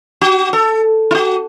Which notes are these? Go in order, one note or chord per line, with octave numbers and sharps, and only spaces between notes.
F#4
A4
E4
F#4